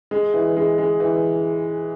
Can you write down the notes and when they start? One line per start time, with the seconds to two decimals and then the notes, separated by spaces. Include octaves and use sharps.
0.11 G#3
0.34 E3
0.57 G#3
0.78 G#3
1.00 E3